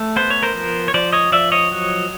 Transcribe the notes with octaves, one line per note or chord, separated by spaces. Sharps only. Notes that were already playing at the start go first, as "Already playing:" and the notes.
Already playing: A3
B3 C5
C#5
A#4 C5
F3
C#5
F3 C5 D5
C#5 D#5
F3 D5 E5
C#5 D#5
F#3